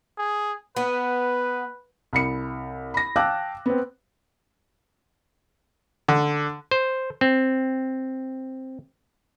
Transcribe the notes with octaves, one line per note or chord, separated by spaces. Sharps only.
G#4
B3 B4
C2 B5 C#7
B5 A#6
F5 G5 A5 D6 E6 F#6
B3 C4
D3
C5
C4